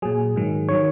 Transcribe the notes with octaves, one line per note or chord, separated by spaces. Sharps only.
A#2 F#3 G#4
G#2 D#3 F#3
D#3 F#3 C#5